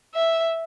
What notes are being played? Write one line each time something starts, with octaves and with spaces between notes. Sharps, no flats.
E5